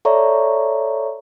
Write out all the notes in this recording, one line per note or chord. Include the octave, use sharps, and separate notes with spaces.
A4 C#5 D5 E5 A#5 C#6